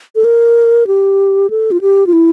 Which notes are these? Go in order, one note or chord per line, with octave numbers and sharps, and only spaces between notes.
A4
A#4
G4
A4
F4
G4
F4
E4